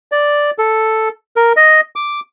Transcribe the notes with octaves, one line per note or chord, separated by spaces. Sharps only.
D5
A4
A#4
D#5
D6